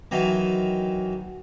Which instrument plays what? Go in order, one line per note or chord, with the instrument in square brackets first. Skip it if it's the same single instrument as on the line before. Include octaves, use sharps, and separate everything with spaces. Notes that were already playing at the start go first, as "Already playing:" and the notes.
[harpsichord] D#3 E3 F#3